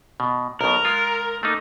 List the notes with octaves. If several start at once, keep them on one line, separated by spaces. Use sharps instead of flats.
B2
B1 B2 A#4
G#3 F4
A3 A#3 D#4